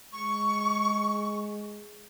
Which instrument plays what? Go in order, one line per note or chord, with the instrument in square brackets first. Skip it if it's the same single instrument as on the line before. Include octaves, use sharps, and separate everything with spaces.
[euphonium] G#3 [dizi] C#6